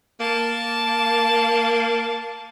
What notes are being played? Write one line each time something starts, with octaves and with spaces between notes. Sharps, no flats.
A#3 A5